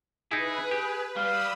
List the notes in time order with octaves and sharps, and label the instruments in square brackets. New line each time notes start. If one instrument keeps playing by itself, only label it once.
[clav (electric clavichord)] D#4 E4 [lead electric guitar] G#4 [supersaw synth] B4
[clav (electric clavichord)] G4
[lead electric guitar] G3 [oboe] F5 [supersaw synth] B5 D#6 E6